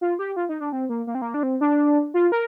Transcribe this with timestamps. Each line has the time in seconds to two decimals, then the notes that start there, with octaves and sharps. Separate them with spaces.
0.01 F4
0.19 G4
0.36 F4
0.49 D#4
0.60 D4
0.72 C4
0.89 A#3
1.07 A#3
1.15 C4
1.22 A#3
1.34 D4
1.43 C4
1.61 D4
2.14 F4
2.32 A#4